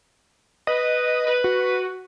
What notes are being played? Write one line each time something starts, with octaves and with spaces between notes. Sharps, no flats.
B4 D#5
B4
F#4